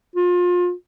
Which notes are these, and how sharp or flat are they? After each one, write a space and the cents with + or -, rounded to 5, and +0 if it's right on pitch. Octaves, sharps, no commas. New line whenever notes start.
F4 +30